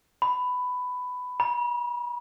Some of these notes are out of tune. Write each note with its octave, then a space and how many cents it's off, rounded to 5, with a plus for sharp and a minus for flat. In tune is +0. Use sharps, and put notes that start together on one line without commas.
B5 +15
B5 -40